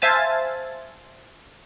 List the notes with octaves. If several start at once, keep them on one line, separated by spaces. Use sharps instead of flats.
C5 E5 F5 G#5 A5 A6